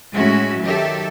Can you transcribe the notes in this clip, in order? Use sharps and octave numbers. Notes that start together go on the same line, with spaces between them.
A2 G#3 C#4 F#4 E5
D#3 F#3 G4 A4 E5